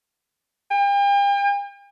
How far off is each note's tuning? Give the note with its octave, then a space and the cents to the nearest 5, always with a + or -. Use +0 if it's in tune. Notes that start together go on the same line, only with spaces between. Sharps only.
G5 +40